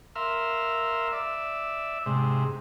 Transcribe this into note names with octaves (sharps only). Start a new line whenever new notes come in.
A#4 E5 F5 C6
D5 E5
G#2 C3